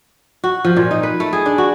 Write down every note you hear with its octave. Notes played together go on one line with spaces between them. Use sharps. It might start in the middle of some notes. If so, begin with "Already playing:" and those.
F#4
F3
A#2
D#4
B4
A3
G#4
D4
F#4